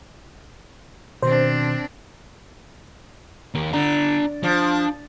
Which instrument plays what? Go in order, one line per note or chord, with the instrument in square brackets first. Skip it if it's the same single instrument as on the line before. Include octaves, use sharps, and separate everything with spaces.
[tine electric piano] B2 D#3 [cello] C4 D4 [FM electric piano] C5
[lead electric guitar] D#2 A#4
[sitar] D3 [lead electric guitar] D4 A#5
[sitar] F3 [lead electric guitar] D4